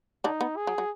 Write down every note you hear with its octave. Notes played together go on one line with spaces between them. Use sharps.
D3 D4 D#4
B3
G#4
F#3
F#3